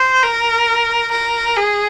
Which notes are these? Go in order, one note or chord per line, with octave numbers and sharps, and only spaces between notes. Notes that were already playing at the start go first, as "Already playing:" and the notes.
Already playing: C5
A#4
A#4
G#4